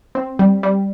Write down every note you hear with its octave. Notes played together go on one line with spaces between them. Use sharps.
C4
G3
G3